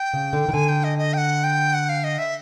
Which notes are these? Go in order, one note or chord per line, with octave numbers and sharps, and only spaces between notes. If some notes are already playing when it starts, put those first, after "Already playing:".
Already playing: G5
C#3
D3
D#3
D3 G#5
G5
D#5
D#5
G5
F#5
G5
F#5
F5
D#5
E5